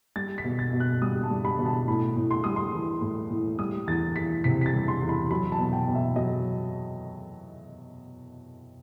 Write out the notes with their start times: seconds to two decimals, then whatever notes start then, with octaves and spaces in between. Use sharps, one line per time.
0.16 G3 A6
0.38 B6
0.44 B2
0.59 A6
0.73 B2
0.80 F#6
1.02 G3 D#6
1.23 A5
1.31 G3
1.45 B5
1.59 B2
1.66 A5
1.87 A2 B5
2.16 A2
2.31 C6
2.44 G3 D#6
2.56 C6
2.73 E3
3.01 A2
3.30 A2
3.59 G3 D#6
3.87 E2 A6
4.16 E3 B6
4.44 C3 B6
4.61 B6
4.66 A6
4.74 G3
4.88 C6
5.02 E2
5.09 B5
5.30 F#3 B5
5.52 A5
5.59 B2
5.73 G5
5.88 B2
5.95 E5
6.16 F#3 D#5